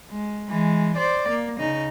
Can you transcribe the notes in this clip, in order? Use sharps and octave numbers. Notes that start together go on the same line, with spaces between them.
G#3
E3 G#3
C5 D5
A#3
C#3 D#4